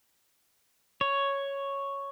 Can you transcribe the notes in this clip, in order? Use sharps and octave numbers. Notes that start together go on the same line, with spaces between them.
C#5